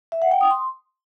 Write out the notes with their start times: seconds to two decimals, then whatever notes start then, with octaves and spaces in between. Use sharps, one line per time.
0.12 E5
0.22 F#5
0.31 G5
0.41 D#6
0.51 C6